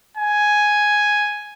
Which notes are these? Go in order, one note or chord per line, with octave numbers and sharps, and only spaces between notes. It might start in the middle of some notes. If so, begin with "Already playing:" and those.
G#5